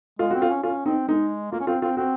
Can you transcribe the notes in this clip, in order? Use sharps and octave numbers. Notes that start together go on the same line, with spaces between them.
G#3 F4
C4 F#4
F4
C#4
C#4 F4
C4 D#4
G#3 D#4
A#3 F4
C#4
C4 F4
C4 F4
C4 F#4